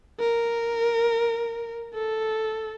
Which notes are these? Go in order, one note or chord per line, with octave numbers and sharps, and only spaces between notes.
A#4
A4